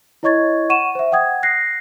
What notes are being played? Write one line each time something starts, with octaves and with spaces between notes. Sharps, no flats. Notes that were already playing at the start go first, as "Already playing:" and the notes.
E4 C#5 D#5 C#6 G#6 A6
F#5 C#6 D#7 E7
C5 E5
F#5 G5 D#6 G#6
F#6 A#6 C7